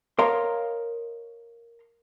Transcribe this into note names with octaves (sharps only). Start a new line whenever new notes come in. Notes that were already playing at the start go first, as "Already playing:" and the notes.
A#4 C#5 D#5 F5 A#5 C6